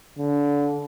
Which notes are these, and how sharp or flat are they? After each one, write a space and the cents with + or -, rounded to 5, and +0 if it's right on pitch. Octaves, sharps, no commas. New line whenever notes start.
D3 -30